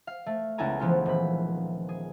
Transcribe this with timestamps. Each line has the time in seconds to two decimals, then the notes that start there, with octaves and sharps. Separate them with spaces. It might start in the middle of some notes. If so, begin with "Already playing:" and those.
0.07 F5
0.26 A3
0.58 C#2 B3 E4 A4 G#5 A#5
0.80 E3 F3 B3 E4 F4
1.05 D#1 B5
1.89 G#4